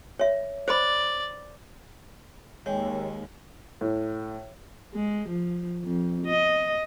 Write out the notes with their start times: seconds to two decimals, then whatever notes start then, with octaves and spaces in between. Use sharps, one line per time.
0.19 C#5 E5
0.68 C5 D5 B5
2.66 D#2 G#3 C#5 G5
3.81 A2
4.94 G#3
5.28 F3
5.85 F2
6.26 D#5